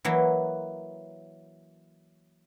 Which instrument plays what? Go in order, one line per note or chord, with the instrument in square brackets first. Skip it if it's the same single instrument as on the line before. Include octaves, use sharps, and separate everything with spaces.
[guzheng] E3 F#3 A#3